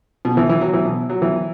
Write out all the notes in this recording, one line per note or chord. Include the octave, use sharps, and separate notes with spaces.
B2
E3
E3
F#3
E3
B2
F#3
E3